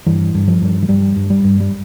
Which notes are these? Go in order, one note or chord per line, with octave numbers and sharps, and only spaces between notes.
G2 E3
G2
F3
G2
F3
G2 G3
G2
G3
G2
G3